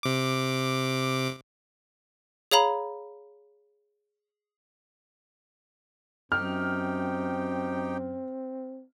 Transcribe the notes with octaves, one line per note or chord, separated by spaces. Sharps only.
C3 D6
G#4 C#5 F5 A#5 B5
F#2 C4 D#4 G4 G5 F6